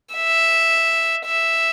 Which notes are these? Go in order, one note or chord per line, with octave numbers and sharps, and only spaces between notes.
E5
E5